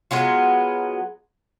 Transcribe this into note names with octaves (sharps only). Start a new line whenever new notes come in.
F#3 G#3 B3 F4